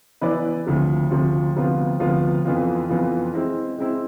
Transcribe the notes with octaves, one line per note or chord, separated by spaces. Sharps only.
E3 B3 E4 B4 D5
D2 C3 F3
D2 C3 F3
D2 C3 F3 B3 F4
D2 C3 F3 B3 F4
F2 E3 B3 F4
F2 E3 B3 F4
G#3 C4 E4
G#3 C4 E4